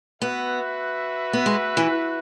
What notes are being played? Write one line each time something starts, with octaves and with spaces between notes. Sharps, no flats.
B3 F#4 B4 E5
B3
G#3
E3